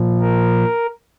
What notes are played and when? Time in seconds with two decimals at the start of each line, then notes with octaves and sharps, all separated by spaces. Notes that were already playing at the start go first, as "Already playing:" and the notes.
Already playing: A#2 F3
0.21 A#4